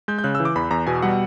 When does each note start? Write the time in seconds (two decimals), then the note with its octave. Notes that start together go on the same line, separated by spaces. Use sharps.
0.08 G#3 G6
0.18 G6
0.24 C#3 F#6
0.35 E6
0.40 E3
0.45 D6
0.56 E2 B5
0.71 E2 A#5
0.87 B2 G#5
1.02 G3 F#5